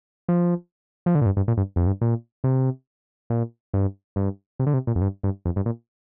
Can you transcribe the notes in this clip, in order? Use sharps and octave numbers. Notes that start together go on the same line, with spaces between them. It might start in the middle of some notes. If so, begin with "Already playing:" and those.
F3
F3
D3
A#2
G2
G2
A#2
G2
F2
G2
A#2
C3
A#2
G2
G2
C3
D3
C3
A#2
F2
G2
G2
F2
G2
A#2